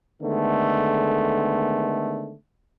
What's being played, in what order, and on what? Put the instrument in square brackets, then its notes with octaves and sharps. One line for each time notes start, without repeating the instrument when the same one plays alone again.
[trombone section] D3 D#3 G#3 A3 B3